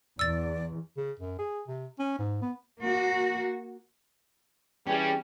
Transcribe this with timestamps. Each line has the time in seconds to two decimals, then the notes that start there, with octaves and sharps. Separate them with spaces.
0.19 E2 D5 E6 A6
0.97 C#3
1.19 F#2
1.39 G#4
1.67 C3
1.99 C#4
2.18 G#2
2.42 B3
2.81 A#3 F#4
4.87 E3 G3 C#4 G4 G#4 G5